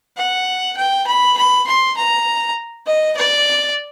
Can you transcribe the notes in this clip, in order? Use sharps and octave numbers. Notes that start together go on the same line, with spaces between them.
F#5
G5
B5
B5
C6
A#5
D#5
D5